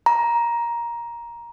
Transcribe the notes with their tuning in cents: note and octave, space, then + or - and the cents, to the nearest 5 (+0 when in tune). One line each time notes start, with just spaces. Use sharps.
A#5 +15